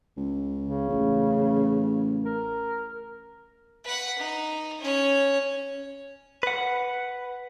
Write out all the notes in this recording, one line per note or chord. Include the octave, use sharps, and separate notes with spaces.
C#2
C#3
A1
A#4
B4 F#5
D#4
C#4 C#5
B4 F#5